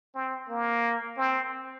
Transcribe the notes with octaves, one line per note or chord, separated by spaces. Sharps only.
C4
A#3
C4